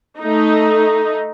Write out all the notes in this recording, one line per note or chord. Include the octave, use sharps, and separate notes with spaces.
A3 D#4